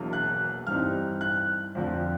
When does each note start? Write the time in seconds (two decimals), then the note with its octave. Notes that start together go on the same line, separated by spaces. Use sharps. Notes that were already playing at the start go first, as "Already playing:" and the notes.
Already playing: E1 E2 B2 F#3 A#3
0.13 F#6
0.67 G2 E3 G3 C4 D#4 F6
1.21 F#6
1.75 F2 D3 F3